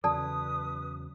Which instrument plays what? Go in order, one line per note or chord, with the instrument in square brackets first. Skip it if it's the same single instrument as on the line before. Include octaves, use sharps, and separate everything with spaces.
[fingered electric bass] E2 C#3 F#3 [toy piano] A4 D5 A5 [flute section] B4 D#6